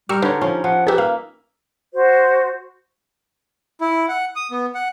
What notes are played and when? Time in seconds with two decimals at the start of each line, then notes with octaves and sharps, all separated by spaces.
0.09 G3 G4 A#4 C#6 E6
0.22 D3 D#4 B4 C#5
0.41 F3 C#4
0.64 F3 F#5
0.87 D#4 G4 G#4 B4 E5
0.98 A#3 F5
1.92 F#4 C5
3.81 E4
4.09 F#5
4.36 D#6
4.51 B3
4.75 F#5